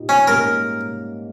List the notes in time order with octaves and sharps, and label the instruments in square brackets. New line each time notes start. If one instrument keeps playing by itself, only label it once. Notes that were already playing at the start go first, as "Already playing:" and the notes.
Already playing: [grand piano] A#2 A#3 D#4 G4
[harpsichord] C#4
[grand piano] G#2 G3 A#3 C#4 [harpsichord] A#4